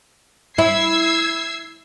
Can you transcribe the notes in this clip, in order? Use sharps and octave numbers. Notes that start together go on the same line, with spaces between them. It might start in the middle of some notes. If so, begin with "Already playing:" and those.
E4 E6 G#6 C7